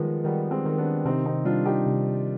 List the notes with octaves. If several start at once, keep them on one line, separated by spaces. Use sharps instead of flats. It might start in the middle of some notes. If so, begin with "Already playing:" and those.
Already playing: D#3 F3 G3 G#3 B3
D#3 G3 B3
G#3 C4
D#3
B3 D4
C3 C4 D#4
C4 D#4
G3 D4 F4
D#4 G4
C3